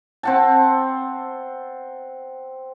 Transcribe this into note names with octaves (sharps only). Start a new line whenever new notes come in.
C4 F#5 A5